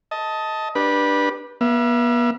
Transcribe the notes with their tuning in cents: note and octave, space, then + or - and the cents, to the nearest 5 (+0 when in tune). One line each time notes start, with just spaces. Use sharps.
D#5 +20 A5 +0
D4 +10 G4 +0 B4 -20
B3 -40 E5 +35